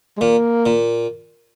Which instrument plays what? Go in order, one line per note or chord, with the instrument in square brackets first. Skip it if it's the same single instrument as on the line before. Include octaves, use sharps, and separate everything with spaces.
[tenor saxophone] G#3
[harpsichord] A#2 [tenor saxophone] A#3
[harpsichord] A#2